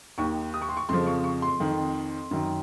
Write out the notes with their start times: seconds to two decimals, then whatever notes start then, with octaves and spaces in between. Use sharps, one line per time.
0.18 D#2 D#3 C#6
0.54 D#6
0.62 C#6
0.69 C6
0.77 C#6
0.89 F2 C#3 F3 C6
1.07 C#6
1.24 C#6
1.42 C6
1.60 F2 D#3
2.31 F#2 D#3